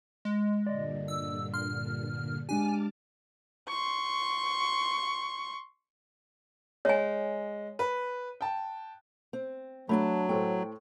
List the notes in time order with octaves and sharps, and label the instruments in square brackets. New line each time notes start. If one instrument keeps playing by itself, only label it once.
[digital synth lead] G#3
[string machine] G2 A#2 D3 [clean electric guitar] D5 D#5
[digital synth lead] E6
[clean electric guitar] C6 [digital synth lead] F6
[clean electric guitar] G#3 D4 G4 [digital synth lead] G#5 [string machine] A5 D6 F6
[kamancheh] C6 C#6
[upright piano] G#3 [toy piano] C#5 G#5
[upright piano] B4
G5 A5
[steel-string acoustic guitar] C4
[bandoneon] F#3 [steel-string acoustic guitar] A3 D4 A5 [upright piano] B5
[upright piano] A2 A4 C5 [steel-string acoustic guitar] G5